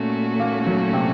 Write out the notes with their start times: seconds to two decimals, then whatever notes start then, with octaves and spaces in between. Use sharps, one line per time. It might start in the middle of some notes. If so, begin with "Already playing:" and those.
Already playing: A#2 A3 C#4 F#4
0.40 A#3
0.66 F#3
0.93 C3